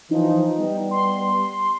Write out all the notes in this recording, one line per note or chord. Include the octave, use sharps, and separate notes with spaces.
E3 F3 D#4
G3 B3
C6